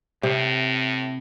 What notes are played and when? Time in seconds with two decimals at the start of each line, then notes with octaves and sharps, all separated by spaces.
0.23 A2 C3